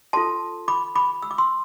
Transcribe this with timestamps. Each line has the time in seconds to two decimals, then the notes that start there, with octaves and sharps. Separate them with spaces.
0.13 F4 A4 C5 A5 C6
0.68 B5 D6
0.95 B5 D6
1.22 E6
1.31 D6
1.38 C6 E6